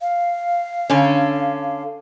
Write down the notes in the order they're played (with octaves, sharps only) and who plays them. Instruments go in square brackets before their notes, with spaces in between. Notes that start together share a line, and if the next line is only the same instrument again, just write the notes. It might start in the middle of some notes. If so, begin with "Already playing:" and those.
[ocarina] F5
[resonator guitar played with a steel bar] D3 C#4